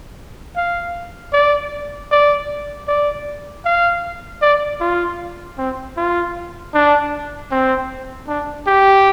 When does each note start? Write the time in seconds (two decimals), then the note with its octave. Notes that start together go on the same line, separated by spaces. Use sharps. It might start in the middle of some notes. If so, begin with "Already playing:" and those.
0.56 F5
1.33 D5
2.11 D5
2.88 D5
3.65 F5
4.42 D5
4.81 F4
5.58 C4
5.97 F4
6.74 D4
7.51 C4
8.28 D4
8.67 G4